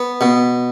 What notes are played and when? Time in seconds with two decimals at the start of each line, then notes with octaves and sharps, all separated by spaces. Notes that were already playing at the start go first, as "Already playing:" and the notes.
Already playing: B3
0.21 B2